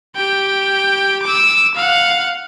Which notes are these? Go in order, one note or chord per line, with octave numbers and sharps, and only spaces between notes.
G4 G5
D6 E6
F5 F#5